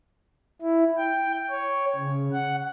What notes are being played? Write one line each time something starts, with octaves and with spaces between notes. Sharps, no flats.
E4
G5
C#5
C#3
F#5